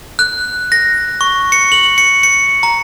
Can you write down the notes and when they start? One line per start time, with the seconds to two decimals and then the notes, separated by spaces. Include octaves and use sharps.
0.19 F#6
0.72 A#6
1.21 C#6
1.52 C#7
1.72 F#7
1.98 C#7
2.23 C#7
2.63 A#5